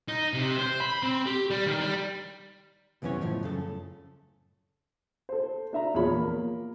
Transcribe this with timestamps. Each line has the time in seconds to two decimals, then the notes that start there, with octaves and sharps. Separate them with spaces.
0.08 D#4
0.34 C3
0.59 C5
0.81 B5
1.03 C4
1.26 G4
1.50 G3
1.67 D#3
1.81 G3
3.02 C2 F#2 E3 B3 C#4 C#5
3.21 C#2 A2 F3
3.43 F#2 C#3 A4
5.29 A4 C5
5.73 D4 E5 A#5
5.94 E2 A#2 F3 G#3 C#5 B5
6.14 A#3